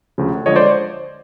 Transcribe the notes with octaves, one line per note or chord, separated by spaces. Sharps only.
D2 C#3 F3
D3 F3 G#3 C#5 D#5
C5 D5